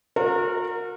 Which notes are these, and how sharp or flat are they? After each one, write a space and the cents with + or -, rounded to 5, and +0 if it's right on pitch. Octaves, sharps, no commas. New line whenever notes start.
F#4 -40 A#4 -20